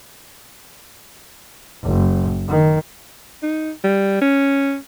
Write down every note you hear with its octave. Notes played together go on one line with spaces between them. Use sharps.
F#1
D#3
D#4
G3
C#4